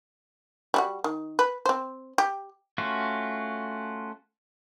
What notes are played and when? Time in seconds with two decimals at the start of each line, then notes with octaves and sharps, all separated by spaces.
0.74 G3 E4 F#4
1.04 D#3
1.39 B4
1.66 C4 C5
2.18 G4
2.78 A3 C#4 F4 F#4